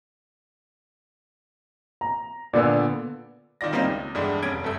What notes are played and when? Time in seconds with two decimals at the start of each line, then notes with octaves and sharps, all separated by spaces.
2.01 A#5
2.53 A#2 D3 B3 D5 E6
3.61 D#3 F4 D5 A#6
3.73 G3 A#3 C4 C#4 D#4 F4
3.84 C#2
4.15 E2 G2 G#3 A3 D4
4.43 F1 C#4 G#6 D7
4.64 G1 A3 A4